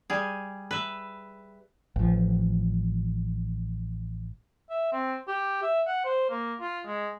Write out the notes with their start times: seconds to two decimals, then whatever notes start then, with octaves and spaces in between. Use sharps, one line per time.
0.10 G3 G#4
0.71 B4 E5
1.96 A1 F3
4.70 E5
4.92 C4
5.28 G4
5.63 E5
5.87 F#5
6.05 C5
6.30 A#3
6.61 F4
6.86 G#3